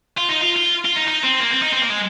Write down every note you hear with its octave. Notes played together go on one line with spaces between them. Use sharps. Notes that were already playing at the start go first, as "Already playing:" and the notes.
F4
D#4
F4
F4
F4
D#4
D#4
C4
A#3
C4
D#4
C4
A#3
G#3